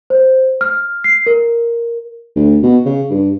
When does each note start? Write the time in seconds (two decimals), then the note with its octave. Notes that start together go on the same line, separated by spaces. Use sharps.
0.10 C5
0.61 F6
1.04 C7
1.26 A#4
2.36 D2
2.63 B2
2.86 C#3
3.10 G2